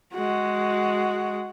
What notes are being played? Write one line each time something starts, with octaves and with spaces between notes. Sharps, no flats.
G#3 F#4